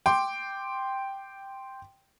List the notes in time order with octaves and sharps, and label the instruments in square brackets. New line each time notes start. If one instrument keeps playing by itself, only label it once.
[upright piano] G5 C6 D6